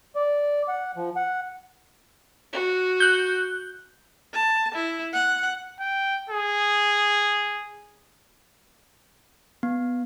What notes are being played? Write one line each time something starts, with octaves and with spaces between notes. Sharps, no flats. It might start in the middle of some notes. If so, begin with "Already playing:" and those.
D5
F#5
F3
F#5
F#4
F#6 G6
A5
E4
F#5
G5
G#4
B3